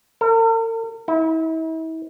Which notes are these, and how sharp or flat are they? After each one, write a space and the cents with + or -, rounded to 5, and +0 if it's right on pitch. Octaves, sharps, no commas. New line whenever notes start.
A#4 -45
E4 -40